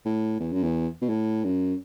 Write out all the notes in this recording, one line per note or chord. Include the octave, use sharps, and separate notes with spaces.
A2
E2
F#2
E2
B2
A2
F#2